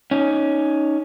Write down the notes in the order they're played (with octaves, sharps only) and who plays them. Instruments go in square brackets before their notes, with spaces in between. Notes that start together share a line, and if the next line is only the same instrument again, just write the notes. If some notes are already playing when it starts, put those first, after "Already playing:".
[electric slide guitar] C#4 D#4